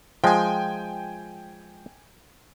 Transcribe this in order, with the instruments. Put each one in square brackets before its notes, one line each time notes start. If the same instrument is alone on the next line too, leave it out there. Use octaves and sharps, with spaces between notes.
[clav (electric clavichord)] F3 G#3 [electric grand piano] G5 G#5